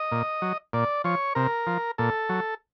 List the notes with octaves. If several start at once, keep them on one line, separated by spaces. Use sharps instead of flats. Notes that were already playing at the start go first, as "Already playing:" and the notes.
Already playing: D#5
A#2
F#3
A#2 D5
F3 C#5
C3 A#4
F3
A#2 A4
F#3